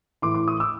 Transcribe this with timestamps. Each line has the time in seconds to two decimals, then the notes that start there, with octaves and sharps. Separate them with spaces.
0.22 A2 E3 C6 D6
0.34 C6 D6
0.48 C#6 D#6
0.60 D6 E6